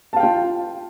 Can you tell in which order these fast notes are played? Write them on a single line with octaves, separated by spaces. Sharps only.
A5 F5 G5 F4